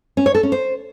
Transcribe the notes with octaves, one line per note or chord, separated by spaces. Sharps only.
C#4
C#5
A4
C#4
C5